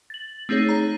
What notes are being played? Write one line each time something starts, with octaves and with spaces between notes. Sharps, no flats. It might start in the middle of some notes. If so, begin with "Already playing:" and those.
A6 F#7
A3 C4 D#4 G#4 C#5
C#5 A#5